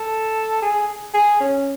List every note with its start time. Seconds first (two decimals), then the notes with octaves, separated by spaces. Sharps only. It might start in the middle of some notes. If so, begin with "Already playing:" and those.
Already playing: A4
0.62 G#4
1.14 G#4
1.40 C#4